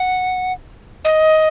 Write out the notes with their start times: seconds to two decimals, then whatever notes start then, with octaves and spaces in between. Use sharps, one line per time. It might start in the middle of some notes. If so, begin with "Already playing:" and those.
Already playing: F#5
1.05 D#5